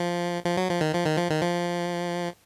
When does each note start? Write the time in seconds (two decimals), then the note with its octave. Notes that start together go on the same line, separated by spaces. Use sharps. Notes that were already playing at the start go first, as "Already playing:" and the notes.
Already playing: F3
0.45 F3
0.57 F#3
0.69 F3
0.81 D#3
0.94 F3
1.06 D#3
1.17 F3
1.30 D#3
1.42 F3